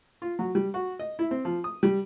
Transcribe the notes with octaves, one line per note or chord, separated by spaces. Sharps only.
F4
F#3
G3
F#4
D#5
E4
C4
F3
D#6
G3